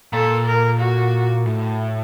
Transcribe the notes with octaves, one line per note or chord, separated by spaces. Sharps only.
A#2 A4
A#4
F#4
A2